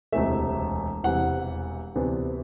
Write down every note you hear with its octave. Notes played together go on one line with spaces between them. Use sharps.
E1 D2 C3 E3 A3 E5
E1 E2 C3 E3 G3 F#5
D2 C3 E3 B3 D4